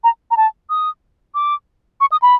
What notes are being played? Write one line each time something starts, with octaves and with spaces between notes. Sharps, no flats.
A#5
A#5
A5
D#6
D6
C#6
D#6
B5